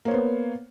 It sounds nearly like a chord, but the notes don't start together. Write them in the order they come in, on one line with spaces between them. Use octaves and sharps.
A#3 C#5 C5 B3